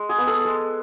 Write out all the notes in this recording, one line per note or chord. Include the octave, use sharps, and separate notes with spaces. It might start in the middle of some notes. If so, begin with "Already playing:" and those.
Already playing: G#3
G#4
B3
A4
G#3